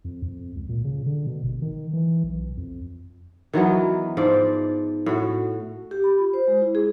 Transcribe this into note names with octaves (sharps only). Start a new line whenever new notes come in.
F2
F2
C#2
A#2
C#3
D3
B2
G#1
D#3
E3
B1
F2
D#3 E3 F#3 B3
G#2 F3 D5
A2 F#4
G4
B5
F4
C5
G#3
E4
G#4